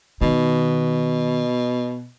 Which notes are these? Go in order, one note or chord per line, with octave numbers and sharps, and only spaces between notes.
B2 D#3